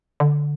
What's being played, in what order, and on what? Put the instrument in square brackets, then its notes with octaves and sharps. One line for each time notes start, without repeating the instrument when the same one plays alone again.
[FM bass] D3